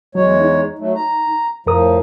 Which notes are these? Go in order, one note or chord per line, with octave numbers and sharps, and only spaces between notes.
E2 F#3 G#3 C#5
D#4
F#3 A3
A#5
F2 A2 F3 A#4 D#6